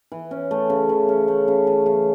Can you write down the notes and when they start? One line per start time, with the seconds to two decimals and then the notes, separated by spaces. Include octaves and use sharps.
0.12 E3
0.31 C#4
0.51 A3
0.70 C#3
0.89 E3
1.09 C#4
1.28 A3
1.48 C#3
1.67 E3
1.86 C#3